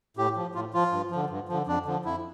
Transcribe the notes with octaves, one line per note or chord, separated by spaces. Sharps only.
A2 G4
F3
A2 F4
F3 F4
G2
D3 F3
G2
D3 F3
F2 D4
D3 F3
F2 E4